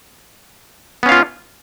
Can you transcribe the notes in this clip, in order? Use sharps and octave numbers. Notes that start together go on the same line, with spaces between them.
B3 C#4 F4 F5